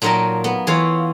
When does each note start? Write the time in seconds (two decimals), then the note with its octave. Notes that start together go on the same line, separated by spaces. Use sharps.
0.02 A#2 F#3 D#4 A#4 G5 A5
0.44 B3
0.67 E3 F4 C#5 F5